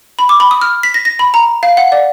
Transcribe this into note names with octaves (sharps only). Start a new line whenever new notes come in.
B5
D6
B5
D#6
F6
B6
A#6
A#6
B5
A#5
F5
F#5
D5